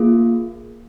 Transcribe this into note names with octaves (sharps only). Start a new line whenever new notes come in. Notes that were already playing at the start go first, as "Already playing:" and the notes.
Already playing: A#3 F4 G#4